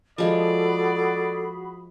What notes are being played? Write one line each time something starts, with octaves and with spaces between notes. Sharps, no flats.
F3 G#3 F#4 G#4 A4 D5 B5